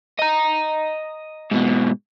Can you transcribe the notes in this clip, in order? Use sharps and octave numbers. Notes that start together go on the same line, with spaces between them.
D#5 A#5
G#2 B2